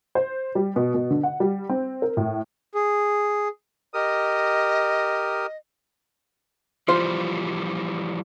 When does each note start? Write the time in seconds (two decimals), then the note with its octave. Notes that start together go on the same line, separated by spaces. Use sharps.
0.15 C5
0.55 G3
0.76 B2
0.94 B2
1.10 D3
1.23 F#5
1.40 G3
1.69 C4
2.02 A#4
2.17 A2
2.75 G#4
3.94 G4 A#4 D#5 D#6
6.88 E3 F3 G3 F4 C5